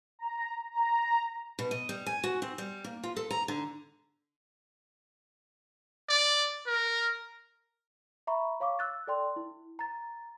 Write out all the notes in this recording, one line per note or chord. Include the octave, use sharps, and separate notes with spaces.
A#5
A#5
B2
D#5
G3
G#5
F#4
C4
G3
A#3
F4
A4
A#5
D3
D5
A#4
E5 A#5 B5 C#6
C#5 F5 C#6 D6
E6 F#6 A6
A4 D5 G5 C6
E4
A#5 A6